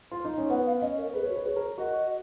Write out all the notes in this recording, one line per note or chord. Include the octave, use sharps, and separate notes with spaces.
F4
D#4
C#4
B3 F#5
F5
C#4 D#5
A#4
G#4 B4
C#5
F#4
B4
G#4 C#5
A#4
F#4 D#5